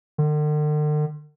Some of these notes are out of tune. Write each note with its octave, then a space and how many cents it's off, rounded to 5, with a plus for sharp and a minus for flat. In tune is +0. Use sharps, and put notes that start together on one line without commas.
D3 +45